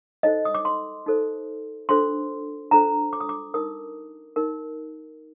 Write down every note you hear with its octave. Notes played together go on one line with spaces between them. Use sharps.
D#4 A4 C5 D#5
D#6
D6
C6
D#4 A4 C5
D4 F4 A4 C5 C6
D4 F4 A4 C5 A#5
D6
D#6
D6
D#4 A#4 D#6
D#4 A#4